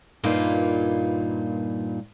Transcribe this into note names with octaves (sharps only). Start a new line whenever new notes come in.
G2 A#2 A#3 D#4 F4 B4